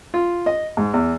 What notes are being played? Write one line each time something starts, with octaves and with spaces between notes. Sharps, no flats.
F4
D#5
G#2
E2